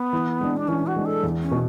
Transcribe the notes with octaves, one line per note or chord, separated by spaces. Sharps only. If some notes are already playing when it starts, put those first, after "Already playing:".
Already playing: B3
E3
G#3 D4
D4
E3 C#4
F#4
G#3 D4
A4
E2
C#4
B2